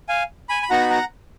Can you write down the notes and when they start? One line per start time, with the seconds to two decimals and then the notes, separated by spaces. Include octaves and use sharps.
0.09 F5 G#5
0.49 G#5 B5
0.63 B5
0.70 B3 D#4 F#4 F#5 A#5
0.81 B5
0.90 F#5 A#5